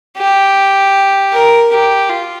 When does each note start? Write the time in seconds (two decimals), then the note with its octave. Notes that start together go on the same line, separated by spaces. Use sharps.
0.18 G4
1.32 A#4
1.72 G4
2.10 F4